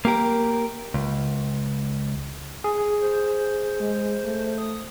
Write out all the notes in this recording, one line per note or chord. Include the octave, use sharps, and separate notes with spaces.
A#3 G4 A#4
C#2
G#4
C5
G#3
A3
D#6